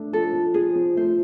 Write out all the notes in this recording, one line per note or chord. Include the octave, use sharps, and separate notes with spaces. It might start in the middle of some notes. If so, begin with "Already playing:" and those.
Already playing: A3 D4
F3 A4
F3
F3 G#4
F3
A3 C5